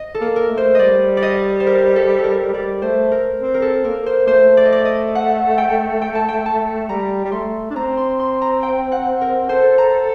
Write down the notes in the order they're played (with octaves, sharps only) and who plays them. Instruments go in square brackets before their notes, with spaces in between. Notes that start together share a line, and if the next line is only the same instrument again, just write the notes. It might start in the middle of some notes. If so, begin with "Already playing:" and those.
Already playing: [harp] D#5
A4
[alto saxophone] A#3
[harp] A#4
[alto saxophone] A3
[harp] C5
[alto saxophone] G3 [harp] D5 D#5
[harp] D5
D#5
C5
A#4
A4
A4
A#4
[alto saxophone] G3 [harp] D5
[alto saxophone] A3 [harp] C5
[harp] A#4
[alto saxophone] C4
[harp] A#4
A4
[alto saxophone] A#3 [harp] A#4
[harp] C5
[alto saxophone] A3 [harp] C5
[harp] D5
D#5
D5
D#5
F#5
G5
G5
A5
G5
A5
[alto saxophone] G3 [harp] A#5
[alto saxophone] G3
[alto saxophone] A3 [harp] C6
[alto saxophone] D4
[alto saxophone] C4 [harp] A#5
[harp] C6
C6
A#5
G5
F#5
A#4
[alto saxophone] A4 [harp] C5
[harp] A#5